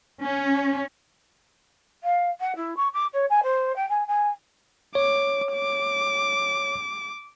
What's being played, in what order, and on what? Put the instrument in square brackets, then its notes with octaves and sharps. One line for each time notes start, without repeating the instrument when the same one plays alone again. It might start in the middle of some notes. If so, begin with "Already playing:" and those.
[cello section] C#4
[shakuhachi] F5
F#5
E4
C#6
D6
C#5
G#5
C5
G5
G#5
G#5
[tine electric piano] C#5 [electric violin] D6
[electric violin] D6